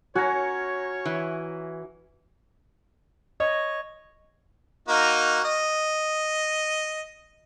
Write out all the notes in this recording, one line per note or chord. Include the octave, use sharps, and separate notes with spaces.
C#4 F#4 C#5 A#5
E3
C#5 D#5
A#3 D#4 F#4
D#5